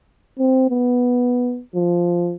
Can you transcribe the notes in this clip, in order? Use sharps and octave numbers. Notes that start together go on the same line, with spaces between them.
C4
B3
F3